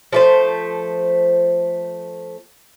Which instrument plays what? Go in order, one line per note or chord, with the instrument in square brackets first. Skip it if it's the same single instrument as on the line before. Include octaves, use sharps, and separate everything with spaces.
[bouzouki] F3 A3 C5